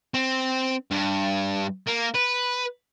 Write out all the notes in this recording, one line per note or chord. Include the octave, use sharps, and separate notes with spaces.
C4
G2
A#3
B4